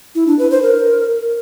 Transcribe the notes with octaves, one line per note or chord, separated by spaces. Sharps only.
E4
D4
B4
C5
A#4